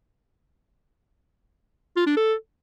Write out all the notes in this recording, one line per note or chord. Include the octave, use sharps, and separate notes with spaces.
F4
D4
A4